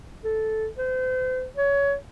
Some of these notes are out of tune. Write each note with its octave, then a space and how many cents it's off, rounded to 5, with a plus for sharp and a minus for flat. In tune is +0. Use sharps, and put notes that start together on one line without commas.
A4 -10
C5 -35
C#5 +20